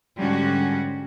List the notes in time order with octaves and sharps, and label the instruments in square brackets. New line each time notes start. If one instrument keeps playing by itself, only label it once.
[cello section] G#2 D3 G3 C#4 F#4